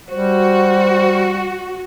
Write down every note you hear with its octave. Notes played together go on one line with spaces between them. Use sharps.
G3 F#4 C5